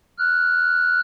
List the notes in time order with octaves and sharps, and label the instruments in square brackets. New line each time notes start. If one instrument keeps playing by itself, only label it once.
[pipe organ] F6 F#6